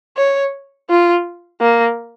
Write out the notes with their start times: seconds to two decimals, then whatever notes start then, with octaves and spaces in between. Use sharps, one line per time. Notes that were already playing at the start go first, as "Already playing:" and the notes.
0.17 C#5
0.89 F4
1.61 A#3